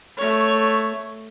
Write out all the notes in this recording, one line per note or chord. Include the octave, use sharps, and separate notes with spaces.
A3 C#5